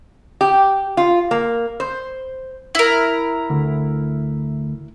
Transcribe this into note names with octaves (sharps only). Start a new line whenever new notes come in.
G4
F4
A#3
C5
E4 A#4
D2